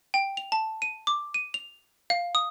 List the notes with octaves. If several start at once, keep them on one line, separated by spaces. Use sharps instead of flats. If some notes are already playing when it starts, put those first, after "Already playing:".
G5
F7
A5
D#7
D6
D#7
F7
F5
D#6